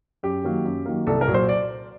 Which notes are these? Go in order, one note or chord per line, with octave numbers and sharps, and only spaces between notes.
F#2 G4
D#3 F#3 A#3
F#2
D#3 F#3 A#3
C2 A4
A#4
A#2 F#3
C5
D5